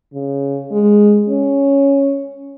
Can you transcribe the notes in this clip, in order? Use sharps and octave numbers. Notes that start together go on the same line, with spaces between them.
C#3
G#3
C#4